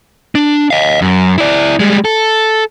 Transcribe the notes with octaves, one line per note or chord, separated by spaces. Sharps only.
D4
D#5 F5
F#2
E4 D5
G3 G#3
A4